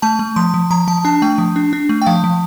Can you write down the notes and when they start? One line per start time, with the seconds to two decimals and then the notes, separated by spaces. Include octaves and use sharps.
0.02 A3 A5
0.19 A3
0.36 F3 C6
0.54 F3
0.71 F3 A#5
0.88 F3 A5
1.05 D4 A5
1.22 A3 G5
1.38 F3
1.56 D4
1.73 D4
1.89 A3
2.02 G5
2.06 F3 F5
2.24 F3